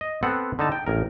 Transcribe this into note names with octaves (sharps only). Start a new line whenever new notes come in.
D#5
B3 C4 A4 F#5
D3 D#4 A5
G5
A1 A#4